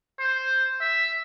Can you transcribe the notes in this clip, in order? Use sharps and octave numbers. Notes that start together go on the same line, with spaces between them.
C5
E5